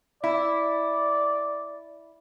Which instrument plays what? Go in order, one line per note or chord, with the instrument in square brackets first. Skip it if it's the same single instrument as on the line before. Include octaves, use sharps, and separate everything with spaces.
[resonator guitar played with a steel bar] E4 [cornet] D5